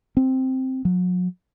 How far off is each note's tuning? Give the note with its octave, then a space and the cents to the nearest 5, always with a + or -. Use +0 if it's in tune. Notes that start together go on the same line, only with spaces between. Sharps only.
C4 +0
F#3 -40